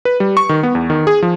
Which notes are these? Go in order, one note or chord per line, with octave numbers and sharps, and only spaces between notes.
B4
G3
C#6
D#3
B3
E2
D#3
G#4
F3